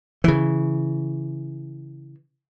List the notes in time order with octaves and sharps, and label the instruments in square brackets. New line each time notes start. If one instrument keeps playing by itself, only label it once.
[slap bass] C#3 E3